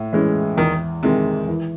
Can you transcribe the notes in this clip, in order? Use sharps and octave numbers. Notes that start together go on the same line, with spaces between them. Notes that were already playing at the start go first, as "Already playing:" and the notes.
Already playing: A2
E3 G#3 C#4
E2 D#3
C3 D#3 G#3
E3